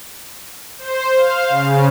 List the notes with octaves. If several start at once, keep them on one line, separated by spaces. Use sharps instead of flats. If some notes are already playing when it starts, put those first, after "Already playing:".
C5
F5
C#3